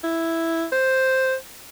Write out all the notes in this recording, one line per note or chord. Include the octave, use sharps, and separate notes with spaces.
E4
C5